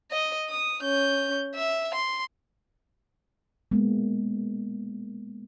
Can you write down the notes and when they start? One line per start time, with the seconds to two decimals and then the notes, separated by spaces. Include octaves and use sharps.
0.11 D#5
0.49 D#6
0.82 C#4 G6
1.55 E5
1.95 C6
3.72 G#3 A#3 B3